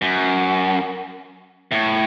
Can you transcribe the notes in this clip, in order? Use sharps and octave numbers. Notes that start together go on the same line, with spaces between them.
F#2
A2